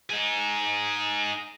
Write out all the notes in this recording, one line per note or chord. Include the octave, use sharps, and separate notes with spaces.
D#4 G#4